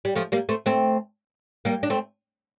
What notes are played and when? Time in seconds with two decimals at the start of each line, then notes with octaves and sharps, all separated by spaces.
0.05 G3
0.16 F3 A3
0.32 G3 A#3
0.49 A3 C4
0.66 A3 C4
1.65 G3 A#3
1.83 D4
1.90 A3 C4